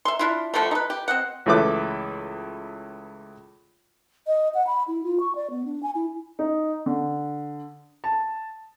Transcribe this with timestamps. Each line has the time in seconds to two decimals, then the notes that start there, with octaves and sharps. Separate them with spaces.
0.05 E5 C6
0.19 D4 E4 F4
0.54 D3 F3 G3 A3
0.71 D#4 B4
0.90 G4
1.08 C4 D#5 F#5
1.46 C#2 E3 A3 B4 D6
4.27 D#5
4.54 F#5
4.67 B5
4.88 E4
5.04 F4
5.20 C#6
5.35 D5
5.50 B3
5.65 D4
5.83 G#5
5.95 E4
6.39 D#4
6.86 D3
8.04 A5